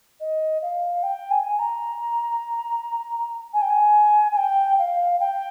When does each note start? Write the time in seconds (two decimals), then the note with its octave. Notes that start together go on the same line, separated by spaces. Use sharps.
0.20 D#5
0.62 F5
1.03 G5
1.31 G#5
1.59 A#5
3.53 G#5
3.61 G5
3.69 G#5
4.31 G#5
4.37 G5
4.78 F5
5.20 G5